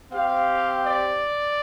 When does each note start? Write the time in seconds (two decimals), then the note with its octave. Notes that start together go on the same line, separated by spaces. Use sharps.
0.12 C4 G4 F5
0.84 D5